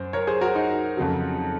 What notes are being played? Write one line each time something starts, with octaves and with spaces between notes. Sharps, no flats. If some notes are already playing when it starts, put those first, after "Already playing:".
Already playing: F#2 C5
A#4 C#5
G#4 C5
F#4 A#4
D#4
F2 C#3 F#3